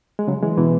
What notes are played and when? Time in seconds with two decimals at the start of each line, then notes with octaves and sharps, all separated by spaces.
0.19 G#3
0.28 C#3 F#3
0.43 E3 G#3
0.57 B2 E3